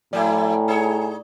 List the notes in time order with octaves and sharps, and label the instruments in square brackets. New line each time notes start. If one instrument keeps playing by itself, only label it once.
[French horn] A2 [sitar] F3 A3 E4 [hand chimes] D5 [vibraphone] G5 G#5 A#5
[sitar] D#4 G#4 C#5